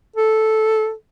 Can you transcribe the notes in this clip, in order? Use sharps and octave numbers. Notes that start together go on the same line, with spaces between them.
A4